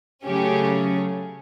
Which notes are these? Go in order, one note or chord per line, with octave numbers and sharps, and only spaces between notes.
C#3 F#3 A3 C#4 G4